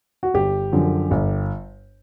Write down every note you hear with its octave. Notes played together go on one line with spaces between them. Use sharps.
F#4
G1 G4
F#2 D3 F3
G1